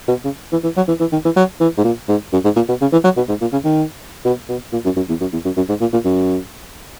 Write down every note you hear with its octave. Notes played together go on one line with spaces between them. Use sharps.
B2
C#3
E3
E3
F#3
E3
E3
D#3
E3
F#3
E3
G#2
A#2
G#2
F#2
G#2
A#2
B2
C#3
E3
F#3
B2
G#2
A#2
C#3
D#3
B2
B2
A#2
F#2
F#2
E2
F#2
E2
F#2
F#2
G#2
A#2
A#2
F#2